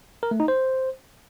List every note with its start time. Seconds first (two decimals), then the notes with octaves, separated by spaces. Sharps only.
0.23 A#4
0.31 A3
0.40 D#4
0.48 C5